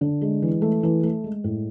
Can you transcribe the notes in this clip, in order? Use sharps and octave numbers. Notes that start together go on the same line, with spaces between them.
D3
G#3
E3
A3
E3
A3
G#3
A2